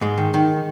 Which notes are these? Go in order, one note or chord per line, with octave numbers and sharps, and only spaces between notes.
G#2 G#3
D#3
D#3